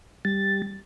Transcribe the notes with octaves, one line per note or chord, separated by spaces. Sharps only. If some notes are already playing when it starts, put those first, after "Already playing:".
G3 A6